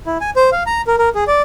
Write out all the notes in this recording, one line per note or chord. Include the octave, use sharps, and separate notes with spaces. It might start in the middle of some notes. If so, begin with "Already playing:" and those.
E4
G#5
C5
F5
A#5
A#4
A#4
G#4
D5